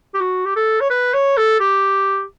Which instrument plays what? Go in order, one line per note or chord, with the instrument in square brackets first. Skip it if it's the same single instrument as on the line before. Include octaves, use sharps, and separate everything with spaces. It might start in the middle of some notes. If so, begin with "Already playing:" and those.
[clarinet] G4
F#4
G4
A4
C#5
B4
C#5
A4
G4